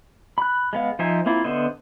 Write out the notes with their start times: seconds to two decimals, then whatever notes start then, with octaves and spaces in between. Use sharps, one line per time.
0.38 B5 F#6
0.73 G#3 B3 F5
0.99 F3 D#4 C5 E5 G#5
1.26 A#3 C4 E4 F4
1.44 D3 B3 C5 D#5 E5